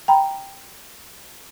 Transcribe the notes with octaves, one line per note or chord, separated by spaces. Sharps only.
G5 A#5 B5